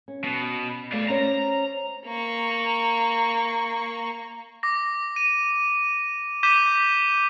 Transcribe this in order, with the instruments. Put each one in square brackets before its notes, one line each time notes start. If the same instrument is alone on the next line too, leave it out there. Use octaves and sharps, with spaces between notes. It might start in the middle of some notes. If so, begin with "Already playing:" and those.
[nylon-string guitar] C#4
[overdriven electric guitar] B2
[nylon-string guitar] A3 [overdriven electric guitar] D5 F5
[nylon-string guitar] C#4 C5 D5 [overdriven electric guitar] A#5
[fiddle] A#3 C#6
[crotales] D6 A#6
D#7
D6 G6 B6 D#7 E7 G7